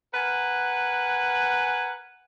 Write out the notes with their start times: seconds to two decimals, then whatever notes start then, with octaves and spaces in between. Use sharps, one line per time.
0.14 A#4 B4 F#5 G#5